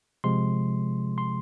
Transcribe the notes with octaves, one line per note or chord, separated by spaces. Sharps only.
C3 F3 G#3 C6
C6